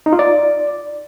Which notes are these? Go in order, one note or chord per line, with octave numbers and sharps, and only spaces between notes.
D#4
F4
D5